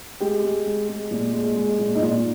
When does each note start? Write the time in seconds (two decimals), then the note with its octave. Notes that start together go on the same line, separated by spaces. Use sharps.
0.20 G#3 G4
0.43 G#3
0.66 G#3
0.88 G#3
1.11 A#2
1.33 G#3
1.56 G#3
1.79 A#2
1.95 D#4
2.01 A#2 F4